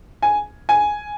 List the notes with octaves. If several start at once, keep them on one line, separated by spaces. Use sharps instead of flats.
G#5
G#5